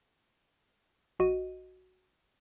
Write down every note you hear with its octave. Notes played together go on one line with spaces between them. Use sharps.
A#1 F#4 D#5 D#7